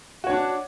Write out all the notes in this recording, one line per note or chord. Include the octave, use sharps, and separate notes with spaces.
D4 F#4 C#5